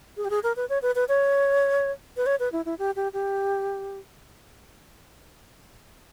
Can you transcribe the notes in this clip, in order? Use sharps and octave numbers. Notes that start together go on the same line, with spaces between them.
G#4
G4
G#4
A#4
B4
C#5
B4
B4
C#5
B4
C#5
B4
E4
E4
G4
G4
G4